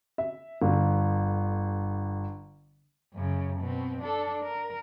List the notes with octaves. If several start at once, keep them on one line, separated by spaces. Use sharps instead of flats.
E5
G1 D3
F#2 C#3
B2 C4
D4 A4
A#4